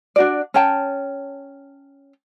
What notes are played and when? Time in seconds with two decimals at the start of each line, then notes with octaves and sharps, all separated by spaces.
0.16 D4 F#4 D5
0.54 C#4 C#5 G5 A5